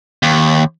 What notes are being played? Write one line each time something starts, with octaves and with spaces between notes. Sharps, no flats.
D#2